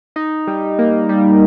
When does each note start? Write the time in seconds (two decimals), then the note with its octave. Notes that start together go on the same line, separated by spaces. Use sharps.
0.16 D#4
0.47 G3
0.79 A#3
1.09 G3